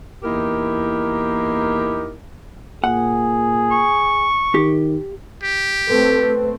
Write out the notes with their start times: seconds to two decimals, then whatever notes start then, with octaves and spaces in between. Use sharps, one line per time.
0.23 E2 A#3 D#4 E4 G4 A#4
2.84 A#2 G#4 F#5
3.71 C#6
4.54 D#3 G4
5.43 G4
5.88 A3 C4 A4 B4